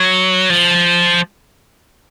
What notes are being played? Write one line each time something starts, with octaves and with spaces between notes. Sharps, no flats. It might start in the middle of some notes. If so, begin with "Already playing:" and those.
Already playing: F#3
F3